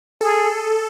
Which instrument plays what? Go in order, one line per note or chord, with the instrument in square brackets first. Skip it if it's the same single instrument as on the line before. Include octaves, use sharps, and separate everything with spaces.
[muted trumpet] G#4 [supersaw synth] A4